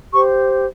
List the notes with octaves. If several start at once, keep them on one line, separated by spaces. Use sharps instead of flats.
G4 C5 C#6